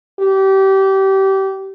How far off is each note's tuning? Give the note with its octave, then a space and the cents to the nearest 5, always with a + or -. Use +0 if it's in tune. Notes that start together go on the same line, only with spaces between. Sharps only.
G4 -25